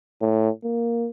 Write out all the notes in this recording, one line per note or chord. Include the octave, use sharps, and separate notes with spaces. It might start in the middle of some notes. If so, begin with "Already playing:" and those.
A2
A#3